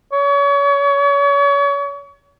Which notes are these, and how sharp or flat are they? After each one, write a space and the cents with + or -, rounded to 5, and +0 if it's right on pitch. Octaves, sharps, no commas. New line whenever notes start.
C#5 +35